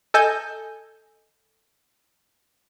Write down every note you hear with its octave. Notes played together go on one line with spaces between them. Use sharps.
A4 D#5 G#5 G6